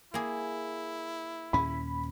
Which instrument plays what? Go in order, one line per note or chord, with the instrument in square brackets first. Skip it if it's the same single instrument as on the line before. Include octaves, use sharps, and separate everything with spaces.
[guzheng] A#3 G#4 [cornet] E4
[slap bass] D#2 A#2 C#4 [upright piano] B5